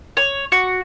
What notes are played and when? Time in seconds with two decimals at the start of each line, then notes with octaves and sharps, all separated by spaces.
0.17 C#5
0.52 F#4